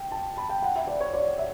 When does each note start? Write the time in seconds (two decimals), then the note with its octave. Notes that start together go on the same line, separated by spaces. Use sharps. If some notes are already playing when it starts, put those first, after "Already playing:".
Already playing: G5
0.12 A5
0.37 B5
0.49 G5
0.62 F#5
0.76 E5
0.87 D5
1.00 C#5
1.13 D5
1.38 E5